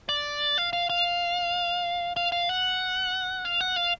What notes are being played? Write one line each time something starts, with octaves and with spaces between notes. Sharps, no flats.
D5
F5
F5
F5
F5
F5
F#5
F5
F#5
F5